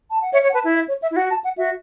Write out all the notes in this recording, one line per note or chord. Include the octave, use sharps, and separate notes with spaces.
A5
F#5
C#5 E5
C#5
F#5
B4 A5
E4
E5
C#5
E5
E4
F#4 F#5
A5
F#5
F#4 E5